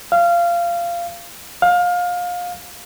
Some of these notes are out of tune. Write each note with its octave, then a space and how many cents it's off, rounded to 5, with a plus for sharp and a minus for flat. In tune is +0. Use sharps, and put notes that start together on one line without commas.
F5 -20
F5 +25